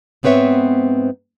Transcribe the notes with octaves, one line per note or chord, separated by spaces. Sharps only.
G#2 B3 C4 B4 C#5 E5